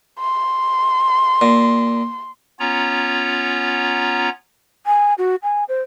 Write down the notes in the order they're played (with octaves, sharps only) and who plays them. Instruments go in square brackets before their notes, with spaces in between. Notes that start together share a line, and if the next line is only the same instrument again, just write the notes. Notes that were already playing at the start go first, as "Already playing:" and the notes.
[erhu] C6
[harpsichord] A#2
[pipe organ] B3 C#4 F4 C#5 A#5
[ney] G#5
F#4
G#5
C5